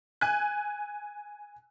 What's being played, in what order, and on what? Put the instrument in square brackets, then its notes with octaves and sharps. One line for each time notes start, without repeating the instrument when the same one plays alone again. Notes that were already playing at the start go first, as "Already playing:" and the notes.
[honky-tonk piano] G#5 F#6